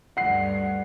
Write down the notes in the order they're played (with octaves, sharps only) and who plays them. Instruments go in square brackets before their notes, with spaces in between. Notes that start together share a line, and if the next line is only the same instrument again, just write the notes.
[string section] D2 G2 [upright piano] F#5 C7